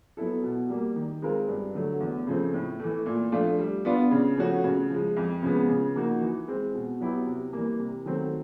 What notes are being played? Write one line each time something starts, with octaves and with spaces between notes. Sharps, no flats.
F#3 B3 E4 A4
B2
G3 A#3
D#3
G#3 C4 F4 A#4
G2
D3 F#3 A3
E2
C#3 F3 A3 C4
A2
E3 A3
A#2
F3 A3 D4 F4
G3
B3 D4 F4
C#3
F3 A3 C#4 F#4
C#3
F3 G#3
F2
C#3 F3 G#3 B3
C#3
F3 A#3 D#4 F#4
E3
G#3 C4
B2
F#3 B3 E4 G4
C3
E3 G3 A#3
C3
D#3 F#3 A3 C4